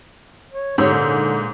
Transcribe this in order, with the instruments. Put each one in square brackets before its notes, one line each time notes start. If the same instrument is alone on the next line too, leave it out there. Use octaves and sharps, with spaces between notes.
[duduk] C#5
[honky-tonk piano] G#2 E6 [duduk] D3 [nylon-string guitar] G4 C#5
[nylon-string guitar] A#2